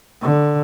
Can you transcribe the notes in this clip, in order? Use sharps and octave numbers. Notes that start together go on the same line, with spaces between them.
D3